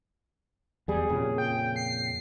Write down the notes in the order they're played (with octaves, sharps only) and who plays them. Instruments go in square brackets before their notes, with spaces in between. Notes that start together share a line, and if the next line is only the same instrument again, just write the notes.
[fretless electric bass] E2 G3 [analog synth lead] G#4
[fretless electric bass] F2 A#2 C#3
[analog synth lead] G5
C7